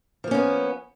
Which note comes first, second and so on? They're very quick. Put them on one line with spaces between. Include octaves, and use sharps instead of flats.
F3 A#3 C#4 B3